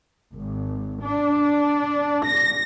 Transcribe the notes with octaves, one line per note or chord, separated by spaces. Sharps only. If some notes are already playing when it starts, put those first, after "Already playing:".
G#1
D4
A#6